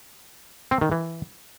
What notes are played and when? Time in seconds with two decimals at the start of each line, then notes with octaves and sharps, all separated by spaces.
0.71 C4
0.81 D#3
0.92 E3